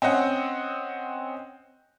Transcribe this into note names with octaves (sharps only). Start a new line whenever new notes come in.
C4 C#4 D#5 F#5